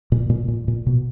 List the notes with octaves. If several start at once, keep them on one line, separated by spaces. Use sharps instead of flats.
A#2
A#2
A#2
A#2
B2